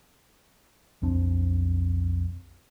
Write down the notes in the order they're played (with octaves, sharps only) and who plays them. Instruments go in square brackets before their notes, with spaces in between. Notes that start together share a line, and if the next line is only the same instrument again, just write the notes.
[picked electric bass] B1 F2 C4 D4